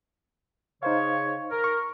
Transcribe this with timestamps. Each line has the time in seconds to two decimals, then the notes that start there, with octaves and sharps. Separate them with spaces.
0.83 C#3 D#4 C5 C#5 F5
1.51 A#4
1.64 C#6